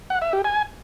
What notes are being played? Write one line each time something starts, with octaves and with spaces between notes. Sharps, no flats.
F#5
E5
G4
G#5